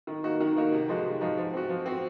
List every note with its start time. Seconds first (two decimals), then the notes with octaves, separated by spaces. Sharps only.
0.07 D#3
0.23 A#3 D#4 F#4
0.40 D#3
0.56 A#3 D#4 F#4
0.72 C3
0.88 F3 G#3 D#4 F#4
1.04 C3
1.21 F3 G#3 D#4 F#4
1.37 F3
1.53 C4 F#4
1.69 F3
1.86 C4 F#4